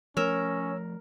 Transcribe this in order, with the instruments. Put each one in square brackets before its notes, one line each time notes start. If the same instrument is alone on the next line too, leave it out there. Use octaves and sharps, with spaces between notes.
[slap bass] F3 A3 [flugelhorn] C#4 [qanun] A#4 [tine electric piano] C#5 E6